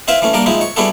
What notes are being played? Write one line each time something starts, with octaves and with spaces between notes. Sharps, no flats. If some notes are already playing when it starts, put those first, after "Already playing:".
C4 E4 B4 E5 F5 B5
E3 A3 C#4
G3 A#3 D4 A#4 D5
F3 G#3 D#4 E4
C#5
G3 B3 E4 F#4 G#4 A4